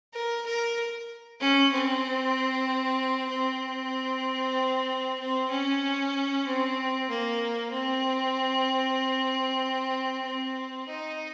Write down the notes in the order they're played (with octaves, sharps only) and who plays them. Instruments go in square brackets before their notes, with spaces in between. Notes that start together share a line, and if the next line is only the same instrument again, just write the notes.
[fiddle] A#4
A#4
C#4
C4
C4
C4
C#4
C4
A#3
C4
C4
D#4